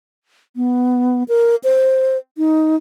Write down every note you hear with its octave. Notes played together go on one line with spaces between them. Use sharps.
B3
A#4
C5
D#4